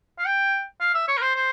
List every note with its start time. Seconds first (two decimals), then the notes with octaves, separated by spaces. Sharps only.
0.19 F5
0.26 G5
0.81 F5
0.94 E5
1.08 C#5
1.18 A#4
1.22 C5
1.36 C5